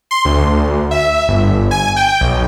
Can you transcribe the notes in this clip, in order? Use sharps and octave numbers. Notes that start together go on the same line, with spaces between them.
C6
D2
E5
G1
G#5
G5
B1